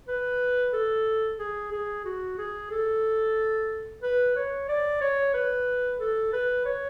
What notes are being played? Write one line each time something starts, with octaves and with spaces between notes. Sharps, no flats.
B4
A4
G#4
G#4
F#4
G#4
A4
B4
C#5
D5
C#5
B4
A4
B4
C#5